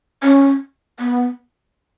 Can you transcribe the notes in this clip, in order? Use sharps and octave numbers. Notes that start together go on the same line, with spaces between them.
C#4
B3